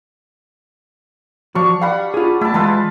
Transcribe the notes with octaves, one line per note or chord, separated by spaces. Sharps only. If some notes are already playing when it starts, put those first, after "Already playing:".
F3 D4 F#4 F5 C#6
G3 F5 F#5 B5
F4 G#4
A3 E4 A5
E3 G#3 F4 B4 A5